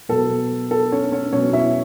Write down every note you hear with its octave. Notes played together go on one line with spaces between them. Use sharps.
B2 F#3 B3 A4
A4
C#4 C#5
C#4 C#5
B2 F#3 B3 C#4 C#5
E4 E5